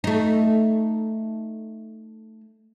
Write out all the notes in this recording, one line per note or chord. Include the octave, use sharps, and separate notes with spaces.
A3 D#4